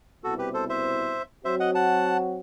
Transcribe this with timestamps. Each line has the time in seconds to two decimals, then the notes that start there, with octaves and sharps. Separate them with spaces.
0.23 C2 B2 G3 C4 E4 F#4 A4
0.39 G4 B4
0.54 A4 C5
0.69 C5 E5
1.45 F#3 C4 F#4 C5 E5
1.60 D#5 F#5
1.75 F#5 A5